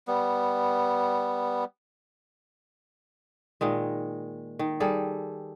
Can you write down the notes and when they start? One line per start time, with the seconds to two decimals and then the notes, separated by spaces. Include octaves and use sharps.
0.08 G3 B3
3.61 A#2 D#3 G#3
4.59 D#3
4.80 G3 G#4 A4